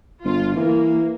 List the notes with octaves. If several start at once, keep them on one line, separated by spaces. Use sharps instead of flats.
G1 F4
E3 A#3